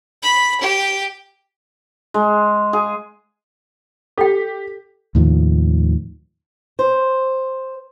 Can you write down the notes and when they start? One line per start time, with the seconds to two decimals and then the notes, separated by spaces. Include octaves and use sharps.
0.22 B5
0.61 G4
2.14 G#3
2.73 G#4
4.18 G4 A4 G5
5.15 D#2 A2 D#3 F3
6.79 C5